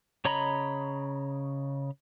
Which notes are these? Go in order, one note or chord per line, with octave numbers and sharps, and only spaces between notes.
C#3 C#5 D#5 A#5 B5